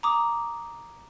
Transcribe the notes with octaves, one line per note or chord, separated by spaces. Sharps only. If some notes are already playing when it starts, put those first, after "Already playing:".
A#5 D6 D#6